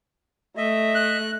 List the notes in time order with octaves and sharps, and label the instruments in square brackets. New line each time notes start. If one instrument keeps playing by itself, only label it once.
[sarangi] A3 [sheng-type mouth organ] D#5 E5
[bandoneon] F#6